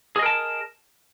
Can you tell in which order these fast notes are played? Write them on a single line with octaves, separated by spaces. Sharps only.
G#4 D#5 A#4 A5